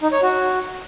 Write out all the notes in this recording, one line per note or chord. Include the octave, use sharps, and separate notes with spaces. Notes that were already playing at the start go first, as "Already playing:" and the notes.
D#4
C#5
F#4